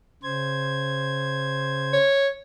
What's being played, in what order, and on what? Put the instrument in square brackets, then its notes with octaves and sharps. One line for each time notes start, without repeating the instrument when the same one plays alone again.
[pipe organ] C#3 C5 G#6
[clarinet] C#5